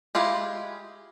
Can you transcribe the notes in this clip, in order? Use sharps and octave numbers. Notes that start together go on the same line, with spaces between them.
G#3 E4 F4 G4